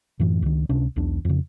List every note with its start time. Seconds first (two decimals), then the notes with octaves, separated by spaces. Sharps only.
0.20 F#2 A2 E3
0.42 C#2 D#3
0.69 C#2 C3 C#4 D4
0.96 B1 E2 D4
1.25 F2 C#3